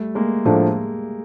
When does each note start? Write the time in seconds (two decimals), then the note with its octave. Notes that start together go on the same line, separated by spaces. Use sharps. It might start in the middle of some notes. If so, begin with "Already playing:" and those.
Already playing: G3 A3
0.15 G#3 A#3
0.45 A2 F3 A3 D4